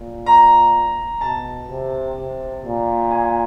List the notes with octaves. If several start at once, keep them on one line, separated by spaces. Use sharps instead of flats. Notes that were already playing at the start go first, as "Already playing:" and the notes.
Already playing: A#2
A#5
B2 A5
C3
C3
A#2
G#5